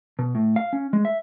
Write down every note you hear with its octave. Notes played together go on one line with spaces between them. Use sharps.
B2
A2
F5
C#4
G#3
E5